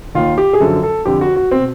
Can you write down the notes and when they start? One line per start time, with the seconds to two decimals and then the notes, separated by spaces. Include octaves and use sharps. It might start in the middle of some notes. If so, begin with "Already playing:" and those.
0.15 D#2 D#3 F4
0.38 G4
0.53 G#4
0.60 F#2 D3 F3 A4
0.83 A4
1.06 F2 D3 F3 G4
1.21 F#4
1.36 F#4
1.51 B2 C4